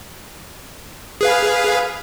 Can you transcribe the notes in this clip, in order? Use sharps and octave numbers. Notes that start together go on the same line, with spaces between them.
G#4 B4 F5